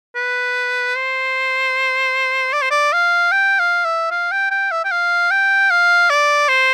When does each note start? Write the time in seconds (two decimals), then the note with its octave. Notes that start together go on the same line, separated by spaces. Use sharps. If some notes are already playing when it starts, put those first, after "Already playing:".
0.16 B4
0.96 C5
2.53 D5
2.62 C5
2.71 D5
2.93 F5
3.32 G5
3.59 F5
3.85 E5
4.11 F5
4.32 G5
4.51 G5
4.72 E5
4.85 G5
4.91 F5
5.31 G5
5.70 F5
6.10 D5
6.48 C5